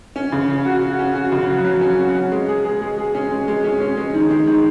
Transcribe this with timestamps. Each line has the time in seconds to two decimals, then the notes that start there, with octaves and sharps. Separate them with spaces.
0.16 C#4
0.32 C#3
0.49 C#4
0.65 F#4
0.82 F#4
0.99 C#4
1.15 F#4
1.32 C#3
1.48 F#3
1.65 F#3
1.81 C#4
1.99 F#4
2.15 C#4
2.32 G#3
2.48 G#4
2.65 G#4
2.81 G#3
2.98 G#4
3.15 C#4
3.31 G#3
3.48 G#3
3.64 C#4
3.80 C#4
3.97 G#3
4.14 D#3
4.30 G#3
4.47 D#3